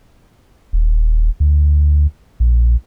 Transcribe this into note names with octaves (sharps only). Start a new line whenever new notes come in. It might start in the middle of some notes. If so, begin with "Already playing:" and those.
D#1
D2
A#1